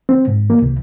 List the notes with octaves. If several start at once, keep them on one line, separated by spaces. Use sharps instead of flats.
C4
G#2
A#3
C2